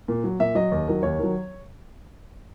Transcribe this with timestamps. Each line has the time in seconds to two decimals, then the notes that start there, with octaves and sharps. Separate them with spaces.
0.08 A#2
0.24 F#3
0.39 A#2 E5
0.55 F#3 D#5
0.72 D#2
0.88 D#3 F#3
1.03 D#2 C#5
1.19 D#3 F#3